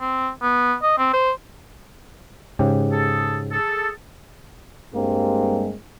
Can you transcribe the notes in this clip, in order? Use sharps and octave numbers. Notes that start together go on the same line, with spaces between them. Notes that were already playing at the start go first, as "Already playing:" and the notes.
C4
B3
D#5
C4
C5
G#2 C#3 G4
G#4 A4
G#4 A4
G2 G3 G#3 A#3 C4